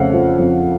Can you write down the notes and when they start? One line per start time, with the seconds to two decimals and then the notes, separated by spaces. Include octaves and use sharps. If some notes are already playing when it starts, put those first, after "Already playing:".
Already playing: F2 C#3 A3 F5 F#5
0.13 F3
0.39 F2